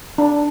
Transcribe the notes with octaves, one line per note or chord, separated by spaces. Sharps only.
D4